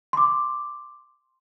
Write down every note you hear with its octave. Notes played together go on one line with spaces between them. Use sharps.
C6 D6